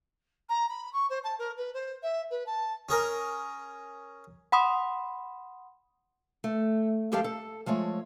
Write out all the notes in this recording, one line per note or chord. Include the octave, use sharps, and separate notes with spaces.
A#5
B5
C#6
C5
A5
A#4
B4
C5
E5
B4
A5
C#4 G#4 A#4
F#5 B5 C6 D#6
A3
F2 G#3 G4 A4 F5 A5
A4
F3 G#3 A3 C#5